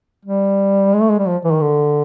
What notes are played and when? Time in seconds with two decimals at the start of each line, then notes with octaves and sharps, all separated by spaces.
0.25 G3
0.94 G#3
1.01 A3
1.10 G#3
1.18 G3
1.27 F3
1.44 E3
1.52 D#3
1.61 D3